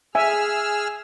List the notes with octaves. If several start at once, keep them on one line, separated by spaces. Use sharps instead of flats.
G#4 E5 G#5 E6 F6